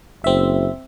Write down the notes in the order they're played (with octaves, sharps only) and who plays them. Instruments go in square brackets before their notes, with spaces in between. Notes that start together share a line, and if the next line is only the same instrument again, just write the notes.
[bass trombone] F#1 [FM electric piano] C4 E5